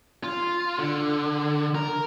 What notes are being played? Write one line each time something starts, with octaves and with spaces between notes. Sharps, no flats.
F4
D3
A#4